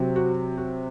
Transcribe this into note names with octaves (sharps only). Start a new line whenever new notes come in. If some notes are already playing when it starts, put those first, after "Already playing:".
Already playing: C3 F#3 C4
F#4
F#4